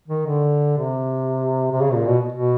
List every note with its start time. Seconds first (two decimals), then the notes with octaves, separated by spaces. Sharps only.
0.08 D#3
0.26 D3
0.77 C3
1.72 C3
1.82 C#3
1.94 A#2
2.07 B2
2.33 B2